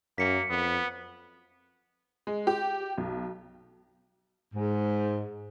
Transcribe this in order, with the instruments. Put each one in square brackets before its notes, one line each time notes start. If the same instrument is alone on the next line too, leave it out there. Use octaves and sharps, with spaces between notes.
[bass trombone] F#2 [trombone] A#3 [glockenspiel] B6 C#7
[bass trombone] F2 [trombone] B3
[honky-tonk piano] G#3
G4
B1
[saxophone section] G#2